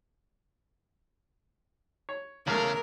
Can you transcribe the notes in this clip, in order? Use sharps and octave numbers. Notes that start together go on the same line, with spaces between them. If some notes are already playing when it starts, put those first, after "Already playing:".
C#5
E2 C#3 A3 A#4 F5